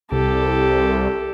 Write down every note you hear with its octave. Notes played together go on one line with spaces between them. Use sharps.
C2 G4 A4